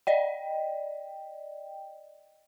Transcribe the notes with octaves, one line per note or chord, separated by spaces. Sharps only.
D5 D#5 G5